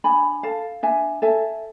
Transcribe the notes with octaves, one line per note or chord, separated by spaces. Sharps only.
D4 G#5 B5
A4 F5 A5
D4 E5 G#5
A4 E5 G#5